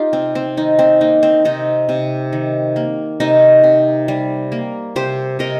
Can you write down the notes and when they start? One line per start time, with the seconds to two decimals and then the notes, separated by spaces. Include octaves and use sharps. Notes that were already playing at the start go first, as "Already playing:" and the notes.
Already playing: D#4 F4 G4
0.13 C3 C4
0.35 C4
0.57 D#3 D#4
0.79 C4
1.01 A#3 D#4
1.23 C4
1.45 C3 D#4
1.89 C3
2.33 D#3
2.76 A#3
3.20 C3 D#4
3.64 C3
4.08 G3
4.52 A#3
4.96 C3 G4 C5
5.39 C3 A#4 D#5